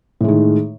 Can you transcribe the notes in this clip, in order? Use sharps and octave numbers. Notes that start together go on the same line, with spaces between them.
A2 D#3 G#3